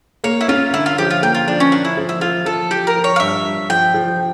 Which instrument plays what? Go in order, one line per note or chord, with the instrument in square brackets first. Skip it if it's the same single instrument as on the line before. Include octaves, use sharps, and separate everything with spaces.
[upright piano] A#3 [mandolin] C#5
[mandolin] E4
[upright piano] C#4 [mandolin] F4
[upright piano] D3 [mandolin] E4
[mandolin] F4
[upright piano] F3 [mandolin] G4
[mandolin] F4
[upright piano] A#3 [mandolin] G4
[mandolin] F4
[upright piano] F3 [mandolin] D4
[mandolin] C#4
[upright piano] F3 [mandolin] D4
[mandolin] E4
[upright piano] F3
[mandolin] E4
[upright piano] F3 [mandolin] F4
[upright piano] F3 [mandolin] A4
[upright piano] F3 [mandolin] G4
[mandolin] A#4
[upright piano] F3
[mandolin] C#5
F5
[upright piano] G2 [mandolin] E5
[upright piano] G2
[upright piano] F3 [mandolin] G5
[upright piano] F3